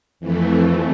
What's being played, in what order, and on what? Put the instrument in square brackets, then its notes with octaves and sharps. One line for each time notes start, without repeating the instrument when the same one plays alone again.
[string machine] F2 E3 A3